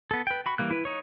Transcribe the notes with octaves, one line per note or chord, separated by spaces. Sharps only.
B3 A4
B4 G5
F#4 B5 C#6
E3 G3 A#3 F#6
E4 B4
D#4 C#5